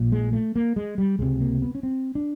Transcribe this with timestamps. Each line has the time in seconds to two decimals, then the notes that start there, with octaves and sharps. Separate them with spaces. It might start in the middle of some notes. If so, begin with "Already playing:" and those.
Already playing: A#1 A#2
0.12 G#3
0.33 A3
0.56 A#3
0.76 G#3
0.98 G3
1.19 C#2 C3 G#3
1.41 A#3
1.62 B3
1.75 C#4
1.83 C4
2.15 D4